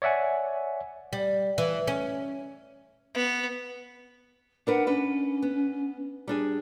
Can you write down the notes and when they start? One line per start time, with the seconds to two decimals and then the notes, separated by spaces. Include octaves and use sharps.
0.02 C#5 D5 E5 F#5 G#5
1.13 G3
1.58 E3
1.88 C#4
3.15 B3
4.67 D4 A#4 B4 F#5
4.87 C#4 D4 B4
5.42 B3
6.28 G3 D4 G#4